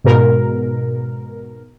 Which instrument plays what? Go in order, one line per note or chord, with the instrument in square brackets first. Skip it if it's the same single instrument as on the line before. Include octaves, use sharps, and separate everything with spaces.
[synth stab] G#2 B2 A#4